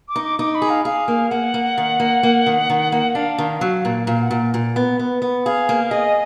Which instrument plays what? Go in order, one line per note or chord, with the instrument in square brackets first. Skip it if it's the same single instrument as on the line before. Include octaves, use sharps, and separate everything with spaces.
[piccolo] D6
[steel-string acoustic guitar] D#4
[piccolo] D6
[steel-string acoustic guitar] D#4 [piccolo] D6
[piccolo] B5
[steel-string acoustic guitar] G#4
[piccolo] F5
[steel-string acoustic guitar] G#4 [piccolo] F5
[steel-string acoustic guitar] A#3
[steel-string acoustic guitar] A#3 [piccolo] F#5
[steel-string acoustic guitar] A#3
D#3
A#3
A#3
D#3
D#3
A#3
[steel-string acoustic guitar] D4 [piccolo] F5
[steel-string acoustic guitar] D#3
F#3
A#2
[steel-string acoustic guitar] A#2 [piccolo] F5
[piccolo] F#5
[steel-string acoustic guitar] A#2
A#2
B3
B3
B3
[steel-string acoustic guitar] G#4 [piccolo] F5
[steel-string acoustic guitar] A#3
[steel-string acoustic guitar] G#4 [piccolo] D#5